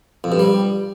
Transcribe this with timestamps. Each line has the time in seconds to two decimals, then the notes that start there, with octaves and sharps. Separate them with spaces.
0.24 F2
0.32 G2
0.39 G3